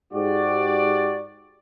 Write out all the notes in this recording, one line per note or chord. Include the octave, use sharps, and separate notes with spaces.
G#2 F#4 G4 D5